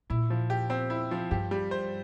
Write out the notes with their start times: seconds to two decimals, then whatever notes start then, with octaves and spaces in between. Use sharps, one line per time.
0.10 A#2 E4
0.30 F3
0.50 G4
0.70 C4
0.90 E4
1.11 F3
1.31 G2 G4
1.51 G3
1.71 C5